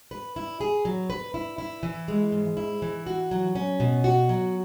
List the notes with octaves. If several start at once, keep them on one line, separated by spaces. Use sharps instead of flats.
B4
E4
G#4
F#3
B4
E4
E4
E3
G#3
G#2
E4
E3
F#4
F#3
C#4
B2
F#4
F#3